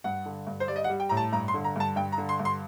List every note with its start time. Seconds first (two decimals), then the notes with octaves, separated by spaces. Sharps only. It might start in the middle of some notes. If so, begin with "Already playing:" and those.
0.04 G2 F#5
0.26 D3
0.47 G2
0.60 C5
0.68 G3 D5
0.76 D#5
0.84 F#5
0.89 G3
1.00 G5
1.09 A2 A#5
1.17 A5
1.32 G2 A#5
1.48 C6
1.54 D3
1.64 A#5
1.76 G2 A5
1.96 G2 G5
2.12 A#5
2.18 D3
2.29 C6
2.40 G2
2.45 C6